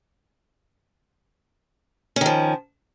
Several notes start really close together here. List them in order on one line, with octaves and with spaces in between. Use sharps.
C#4 D#3 F3